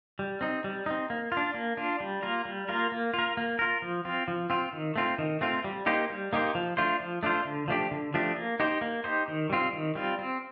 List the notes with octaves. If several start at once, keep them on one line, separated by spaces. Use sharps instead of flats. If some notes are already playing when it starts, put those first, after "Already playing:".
G3
C4 D#4
G3
C4 D#4
A#3
F4
D4
A#3
D4 F4
G3
A#3 F4 A#4
G3
A#3 F4 A#4
A#3
F4
A#4
A#3
F4 A#4
F3
C4 F4
F3
C4 F4
D#3
A3 C4 F4
D#3
A3 C4 F4
G3
A#3 D#4 G4 C5
G3
A#3 D#4 G4 C5
F3
A3 D4 F4 C5
F3
A3 D4 F4 C5
D3
F3 A3 D4 G4
D3
F3 A3 D4 G4
A#3
D#4 G4 C5
A#3
D#4 G4 C5
D#3
G3 C4 F4
D#3
G3 C4 F4
C4